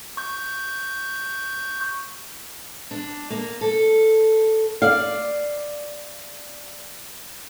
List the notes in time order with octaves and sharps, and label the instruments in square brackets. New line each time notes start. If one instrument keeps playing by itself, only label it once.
[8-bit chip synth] C#6 G6
[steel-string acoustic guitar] D4
A#3
A4
[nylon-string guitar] D5 F5